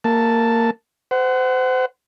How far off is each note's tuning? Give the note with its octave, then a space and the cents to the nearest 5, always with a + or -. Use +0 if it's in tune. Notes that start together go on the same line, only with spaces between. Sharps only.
A#3 -15 A5 +0
C5 -30 F#5 +20